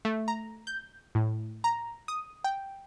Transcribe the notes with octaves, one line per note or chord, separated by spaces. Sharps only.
A3
A#5
G6
A2
A#5
D#6
G5